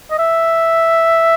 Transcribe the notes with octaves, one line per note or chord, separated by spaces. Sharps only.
D#5
E5